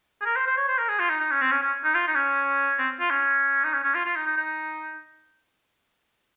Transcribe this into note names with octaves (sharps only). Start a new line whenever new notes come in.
G#4
A#4
C5
C5
C#5
C5
A#4
G#4
F4
D#4
D#4
C#4
C4
C#4
C#4
D#4
F4
D#4
C#4
C4
F4
C#4
D#4
C#4
C#4
F4
F4
D#4
D#4
D#4